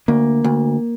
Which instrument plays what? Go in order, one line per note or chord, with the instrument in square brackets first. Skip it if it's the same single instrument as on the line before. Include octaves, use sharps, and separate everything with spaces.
[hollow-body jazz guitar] D2 [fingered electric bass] A#3
[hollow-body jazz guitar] D2